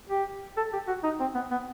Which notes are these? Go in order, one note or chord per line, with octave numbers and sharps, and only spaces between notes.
G4
A4
G4
F#4
D#4
C4
B3
B3